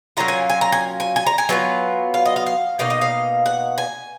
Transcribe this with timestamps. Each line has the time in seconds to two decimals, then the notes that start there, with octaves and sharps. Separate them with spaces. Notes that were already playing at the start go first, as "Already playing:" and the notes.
0.17 F#3 A#3 C#4 F4 A#5
0.28 G#5
0.50 G#5
0.61 A#5
0.72 G#5
1.00 G#5
1.16 G#5
1.26 A#5
1.38 G#5
1.49 F#3 B3 F4
2.14 F5
2.26 D#5
2.36 F5
2.46 F5
2.79 B2 A#3 D#4 F5
2.90 D#5
3.01 F5
3.46 F#5
3.78 G#5